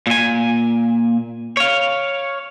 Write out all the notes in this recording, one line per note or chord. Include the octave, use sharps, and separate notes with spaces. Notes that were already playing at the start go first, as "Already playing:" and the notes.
A#2 G#5
C#5 F5